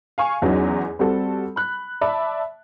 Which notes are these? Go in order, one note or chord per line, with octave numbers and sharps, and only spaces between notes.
F5 G#5 C#6
E2 F#3 C#4 D#4
G3 C4 F#4 A4
B5 F#6
D5 E5 A5 B5